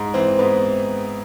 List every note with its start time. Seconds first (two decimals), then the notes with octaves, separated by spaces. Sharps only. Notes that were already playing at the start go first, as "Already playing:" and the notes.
Already playing: G#2
0.14 E3 C4
0.39 G#2 B3